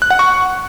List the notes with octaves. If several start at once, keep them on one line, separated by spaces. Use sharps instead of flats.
F#6
F#5
C#6